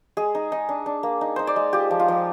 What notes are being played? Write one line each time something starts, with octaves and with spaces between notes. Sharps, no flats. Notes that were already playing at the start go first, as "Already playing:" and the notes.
G#3 G#4
D#4
D#4
D4
D4
A#3
D#4
D#4 C5
D5
G#3
F4 G4
F3
F4
F3